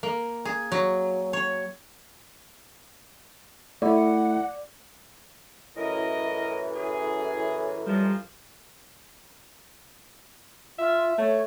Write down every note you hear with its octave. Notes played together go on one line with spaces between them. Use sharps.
A#3
G#4
F#3
C#5
A3 E4 D5 F#5
F#2 A2 E3 A#4 D#5
G#4
A#2 F3 G3 G#3
F4 E5
A3 C#5